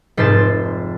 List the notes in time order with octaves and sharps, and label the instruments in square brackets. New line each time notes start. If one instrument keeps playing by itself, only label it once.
[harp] F1 G#2 C5 A5